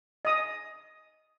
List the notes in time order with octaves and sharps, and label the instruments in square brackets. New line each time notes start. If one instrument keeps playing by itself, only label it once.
[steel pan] D#5 D#6